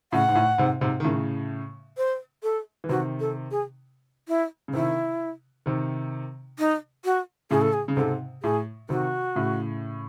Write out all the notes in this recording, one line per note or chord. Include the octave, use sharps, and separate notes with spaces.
A2 C#3 F#5
G#2
A2
G#2 C3
G#2 C3
D#3
A2 C#3
C5
A4
E3
C3 D#3 F#4
A4
G#4
E4
C#3
C3 D#3 E4
C3 D#3
D#4
F#4
A2 C#3 G#4
A4
G#4
C#3
G#2 C3 A4
A2 G#4
C3 D#3 F#4
A2 C#3